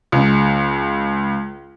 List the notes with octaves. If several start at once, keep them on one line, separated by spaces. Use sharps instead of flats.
C#2 C#3